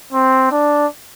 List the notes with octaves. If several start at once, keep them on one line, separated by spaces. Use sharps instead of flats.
C4
D4